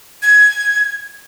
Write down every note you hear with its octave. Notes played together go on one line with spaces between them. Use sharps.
G#6